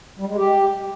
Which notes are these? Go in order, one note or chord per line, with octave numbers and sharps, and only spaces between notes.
G3
G#3
G4